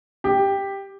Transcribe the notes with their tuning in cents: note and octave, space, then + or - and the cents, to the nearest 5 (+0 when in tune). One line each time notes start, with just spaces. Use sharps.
G4 +5